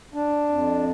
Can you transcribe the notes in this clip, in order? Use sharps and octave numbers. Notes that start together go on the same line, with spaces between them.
D4
F2